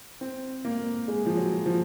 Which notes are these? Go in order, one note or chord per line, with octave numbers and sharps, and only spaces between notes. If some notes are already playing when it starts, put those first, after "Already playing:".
C4
A#3
G#3
F3
F#3
F3